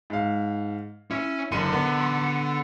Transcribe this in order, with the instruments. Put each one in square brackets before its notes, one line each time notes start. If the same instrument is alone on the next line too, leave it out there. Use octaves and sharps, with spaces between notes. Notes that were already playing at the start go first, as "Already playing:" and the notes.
[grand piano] G#2 F5
[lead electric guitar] C#4 [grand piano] E4
[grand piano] F#1 C#7 D#7 [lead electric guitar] D3 C6
[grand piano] B3